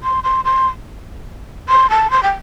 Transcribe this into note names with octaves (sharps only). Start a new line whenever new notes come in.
C6
C6
C6
C6
A5
C6
G5